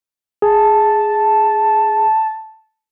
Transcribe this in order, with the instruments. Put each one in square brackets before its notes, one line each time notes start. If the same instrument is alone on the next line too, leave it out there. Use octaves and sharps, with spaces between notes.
[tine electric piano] G#4 [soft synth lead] A5